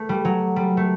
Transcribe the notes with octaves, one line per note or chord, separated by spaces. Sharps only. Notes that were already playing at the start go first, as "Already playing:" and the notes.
Already playing: A3
G3
F#3
G3
A3